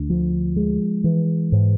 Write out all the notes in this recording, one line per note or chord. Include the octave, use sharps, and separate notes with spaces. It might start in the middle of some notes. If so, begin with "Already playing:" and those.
Already playing: D2 D3
F3
G#3
E3
G#2